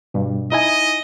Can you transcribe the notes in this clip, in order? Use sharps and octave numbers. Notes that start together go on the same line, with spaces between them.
G2 B2
D#4 E4 D#5 G#5